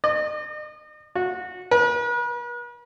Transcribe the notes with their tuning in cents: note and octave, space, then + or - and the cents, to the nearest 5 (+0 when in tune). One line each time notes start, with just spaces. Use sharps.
D#5 -40
F#4 -20
B4 -45